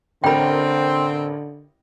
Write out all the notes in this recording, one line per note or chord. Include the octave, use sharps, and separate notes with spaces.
A1 D3 C4 A#4 G5 B5